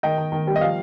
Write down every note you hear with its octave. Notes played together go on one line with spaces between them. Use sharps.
D#3 D#5 G5
D#3
D#3
G3
D#5
F3 F5